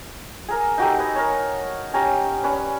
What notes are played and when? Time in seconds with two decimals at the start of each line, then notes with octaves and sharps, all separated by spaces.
0.49 G#4 A#4 A#5
0.78 D#4 F#4 G4 A4
0.99 B4 D#5 G#5
1.14 A#4 C#5 A5
1.94 C#4 G4 A#5
2.43 C#4 B4 D5